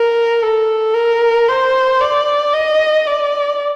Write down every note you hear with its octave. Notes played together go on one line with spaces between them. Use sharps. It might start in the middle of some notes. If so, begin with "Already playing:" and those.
Already playing: A#4
A4
A#4
C5
D5
D#5
D5